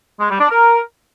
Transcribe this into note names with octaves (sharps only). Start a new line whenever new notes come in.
G#3
G3
D4
A#4